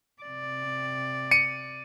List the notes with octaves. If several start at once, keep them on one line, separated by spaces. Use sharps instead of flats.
C3 D5
C#7 D#7